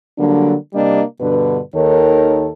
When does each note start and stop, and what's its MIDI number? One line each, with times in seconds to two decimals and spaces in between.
0.18 0.54 50
0.18 0.54 54
0.18 0.54 55
0.18 0.54 58
0.18 0.54 62
0.73 1.02 48
0.73 1.02 55
0.73 1.02 58
0.73 1.02 62
0.73 1.02 75
1.20 1.58 43
1.20 1.58 47
1.20 1.58 50
1.20 1.58 71
1.75 2.49 39
1.75 2.49 51
1.75 2.49 69
1.75 2.49 70
1.75 2.49 73